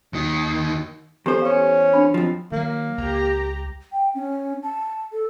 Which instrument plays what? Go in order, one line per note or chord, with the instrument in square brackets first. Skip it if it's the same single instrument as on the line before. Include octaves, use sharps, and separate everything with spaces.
[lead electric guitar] D#2 D#3
[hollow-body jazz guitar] E2 C5 [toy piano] G4 A4
[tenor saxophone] C#4 [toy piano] F5 C#6
[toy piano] D4 B5
[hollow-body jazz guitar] F2 F3
[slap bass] D#3 F#3 [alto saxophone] A#3
[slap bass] C#2 [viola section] G4 A#5
[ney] G5
C#4
A5
A4